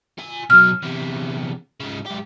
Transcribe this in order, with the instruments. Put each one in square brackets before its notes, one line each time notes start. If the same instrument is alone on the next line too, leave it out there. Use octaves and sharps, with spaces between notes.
[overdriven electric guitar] F4 G#5
[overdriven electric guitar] B2 F#3 [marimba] F6
[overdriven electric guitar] E2 C3
G#2 C#3
G#2 G4